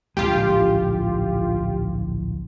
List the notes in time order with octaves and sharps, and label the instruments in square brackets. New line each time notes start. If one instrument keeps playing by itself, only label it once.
[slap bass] D1 A#1 G#3 [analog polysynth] F4 G4